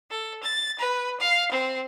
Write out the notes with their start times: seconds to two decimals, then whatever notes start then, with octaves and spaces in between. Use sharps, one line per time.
0.11 A4
0.42 A6
0.78 B4
1.19 F5
1.51 C4